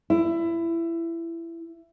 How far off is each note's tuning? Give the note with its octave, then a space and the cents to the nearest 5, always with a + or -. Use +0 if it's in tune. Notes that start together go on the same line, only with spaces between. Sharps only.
E4 +20